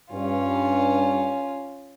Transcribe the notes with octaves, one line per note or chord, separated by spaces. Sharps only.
G2 C#4 F4